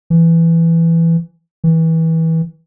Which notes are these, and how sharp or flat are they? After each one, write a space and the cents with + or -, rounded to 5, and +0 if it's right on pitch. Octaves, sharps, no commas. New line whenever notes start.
E3 +10
E3 -25